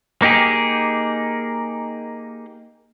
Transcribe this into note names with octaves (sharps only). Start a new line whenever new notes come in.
A#3 D#4 G4 G#4